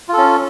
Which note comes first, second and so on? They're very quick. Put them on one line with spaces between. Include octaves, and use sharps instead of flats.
F4 A4 C#4